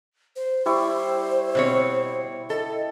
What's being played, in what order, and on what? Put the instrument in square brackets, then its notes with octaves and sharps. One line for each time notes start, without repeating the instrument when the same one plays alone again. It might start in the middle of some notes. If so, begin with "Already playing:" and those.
[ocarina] C5
[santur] G3 E4 C#6 [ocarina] C5
[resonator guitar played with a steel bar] B2 C4 C#5
[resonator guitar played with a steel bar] A4 [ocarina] D#5